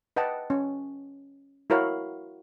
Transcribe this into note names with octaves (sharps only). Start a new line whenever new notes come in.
B4 D#5 F#5 G5 A5
C#4
E4 F#4 A#4 C#5 F5 B5